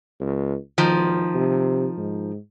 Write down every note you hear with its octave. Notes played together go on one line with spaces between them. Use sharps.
C#2
E1 D#3 F3
C3
G#2